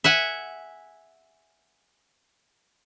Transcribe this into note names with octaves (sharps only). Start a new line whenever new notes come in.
E5 F#5 G#5